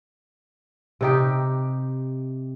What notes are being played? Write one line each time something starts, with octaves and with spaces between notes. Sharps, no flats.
C3 D#4 G4